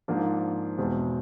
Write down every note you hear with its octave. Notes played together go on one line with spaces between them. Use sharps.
G#2 F3 A#3 D4
E2 B2 G#3 C4